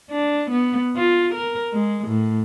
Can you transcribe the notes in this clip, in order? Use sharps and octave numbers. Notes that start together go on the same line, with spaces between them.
D4
B3
F4
A#4
G#3
A2